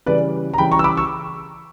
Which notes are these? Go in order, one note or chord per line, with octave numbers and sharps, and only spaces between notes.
C#3 E3 G3 B4 D5
A#5
C#3 E3 G3 G5 B5
A#5 C#6
E6
B5 D6
C#6 E6